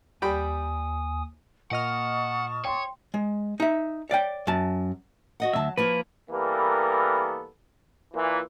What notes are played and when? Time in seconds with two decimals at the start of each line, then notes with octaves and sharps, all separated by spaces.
0.22 D#2 G3 G5 G#5 B5 D#6
1.71 A#2 D#5 F#5 A5 C#6 D#6 F6
2.65 C#5 G5 C6
3.14 G#3
3.60 D#4 E5
4.10 C#5 D5 F5 G5
4.47 F#2 A5
5.40 F#4 D#5 F#5
5.53 D2 A#2 F#3 E5 A5
5.78 F3 A#3 E4 B4
6.30 E3 G3 A#3 B3 A4 A#4
8.14 A#2 E3